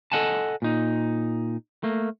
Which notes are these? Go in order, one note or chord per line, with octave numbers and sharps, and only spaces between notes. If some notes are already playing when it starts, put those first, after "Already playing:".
A4 A#4 D#5 F#5 G#5 A5
A#2 D#4
A3 A#3